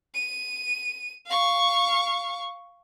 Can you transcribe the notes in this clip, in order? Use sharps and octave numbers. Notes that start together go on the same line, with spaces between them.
D#7
F5 C#6